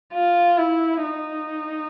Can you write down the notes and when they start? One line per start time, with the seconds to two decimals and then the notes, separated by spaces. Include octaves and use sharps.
0.14 F4
0.58 E4
1.04 D#4